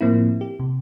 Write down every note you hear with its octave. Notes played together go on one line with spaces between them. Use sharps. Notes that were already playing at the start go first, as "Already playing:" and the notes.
A2 F3 A#3 C4 E4
G4
C3